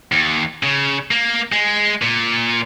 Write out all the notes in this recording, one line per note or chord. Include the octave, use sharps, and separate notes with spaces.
D#2
C#3
A#3
G#3
A#2